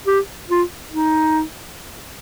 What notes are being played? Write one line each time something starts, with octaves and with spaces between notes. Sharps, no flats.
G4
F4
D#4